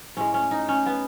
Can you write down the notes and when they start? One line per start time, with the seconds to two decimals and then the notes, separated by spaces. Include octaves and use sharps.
0.17 A2 G#3 C#4
0.34 C#4
0.51 D#4
0.68 C#4
0.86 B3